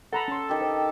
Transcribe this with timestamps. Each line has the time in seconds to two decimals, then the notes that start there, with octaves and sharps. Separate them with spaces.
0.13 A4 F#5 A#5 B5
0.28 C#4 C6
0.49 D#3 G4
0.61 C5